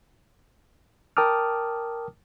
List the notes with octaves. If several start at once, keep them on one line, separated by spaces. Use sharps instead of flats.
A#4 G5 A5 D6 D#6 F6